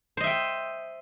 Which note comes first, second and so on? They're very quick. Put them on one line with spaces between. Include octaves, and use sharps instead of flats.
C5 D#5 E5 G5